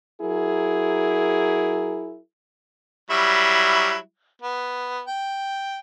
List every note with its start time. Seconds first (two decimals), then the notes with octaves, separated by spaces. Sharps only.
0.22 F#3 E4 G#4 A#4
3.10 F#3 G3 E4
4.42 B3
5.07 G5